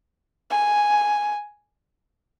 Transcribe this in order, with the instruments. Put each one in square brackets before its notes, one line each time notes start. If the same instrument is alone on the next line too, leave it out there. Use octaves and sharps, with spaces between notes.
[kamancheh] G#5